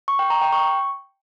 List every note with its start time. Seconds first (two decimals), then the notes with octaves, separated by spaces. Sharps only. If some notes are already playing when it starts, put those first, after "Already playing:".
0.08 C#6
0.19 G5
0.30 A#5
0.41 G5
0.53 C#6